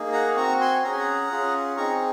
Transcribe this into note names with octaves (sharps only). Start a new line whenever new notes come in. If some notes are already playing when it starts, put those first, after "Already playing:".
Already playing: A#3 D#4 G#4
F#5 A#5
C4 F#4 A#5 C#6
G#5 C6
C#4 G#4 A#5
G#5
F#5 A#5
C#4 F4 G#4
C4 D#4 G#4 A#5 C#6